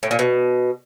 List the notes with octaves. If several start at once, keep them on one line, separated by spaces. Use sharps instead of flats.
A2
A#2
B2